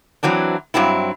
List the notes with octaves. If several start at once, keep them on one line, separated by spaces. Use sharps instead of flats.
E3 F#3 C4 D4
G2 F#3 C4 E4